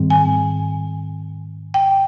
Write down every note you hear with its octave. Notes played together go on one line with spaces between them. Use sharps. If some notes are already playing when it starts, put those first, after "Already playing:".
Already playing: G#2 D#3 G3 C4
G#5
G5